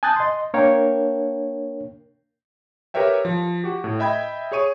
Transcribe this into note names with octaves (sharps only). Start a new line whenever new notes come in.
G#5 A5 D#6 F#6 G6 A6
D#5 C6
A#3 D4 A#4 C#5 F5 G5
G4 A#4 B4 C#5 E5 G5
F3
F#4 G4
A2
D#5 E5 G5 B5 G6 G#6
G#4 C#5 C#6 D#7